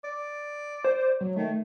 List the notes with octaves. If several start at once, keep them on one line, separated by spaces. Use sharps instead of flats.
D5
C5
F#3
D#3 A3